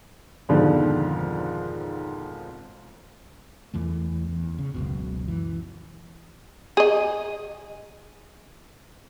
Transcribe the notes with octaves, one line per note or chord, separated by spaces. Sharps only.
F2 G#2 B2 D3 D#3 F3
E2 E3 A3
E2
C#3
F#1 C#2 B2
E3
G#4 D#5